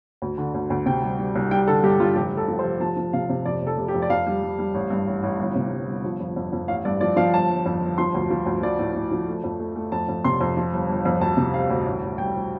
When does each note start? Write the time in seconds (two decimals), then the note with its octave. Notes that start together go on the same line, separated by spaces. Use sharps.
0.22 D2
0.38 D3
0.54 D2
0.70 D2
0.86 C3 G5
1.02 G3
1.19 G3
1.35 C2
1.51 G3 G5
1.68 D3 A4
1.83 G2 G4
2.00 G2 F4
2.16 F1 G4
2.32 F1
2.37 A4
2.48 F3
2.59 C5
2.65 F1
2.80 F3 A5
2.97 F3
3.13 C3 F5
3.29 C3
3.45 F2 D5
3.62 F1 A4
3.77 F1
3.88 G4
3.94 F2
4.02 D5
4.10 F2 F5
4.27 G3
4.43 G3
4.59 G3
4.74 A1
4.90 G2
5.07 A1
5.23 A1
5.39 G1
5.55 C3
5.71 G1
5.87 G1
6.04 F3
6.20 F2
6.36 F2
6.53 F2
6.68 A1 F5
6.85 G2 D5
7.01 F3 D5
7.17 F3 F5
7.33 G1 A5
7.50 G1
7.66 F2
7.82 G1
7.98 F3 C6
8.14 D2
8.30 F3
8.46 D2
8.62 F3 D5
8.79 A2
8.95 A2
9.12 F3
9.27 A3
9.44 F2
9.60 A3
9.76 A3
9.92 F2 A5
10.08 F2
10.24 C3 C6
10.41 F2
10.57 F3
10.73 G1
10.89 G1
11.05 F2
11.21 D2 A5
11.37 C3
11.53 G3 F5
11.70 D2
11.86 A1
12.03 A1
12.18 G3 G5
12.34 G3